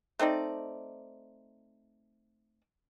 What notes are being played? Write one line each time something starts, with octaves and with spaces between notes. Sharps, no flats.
A3 C4 D#4 D5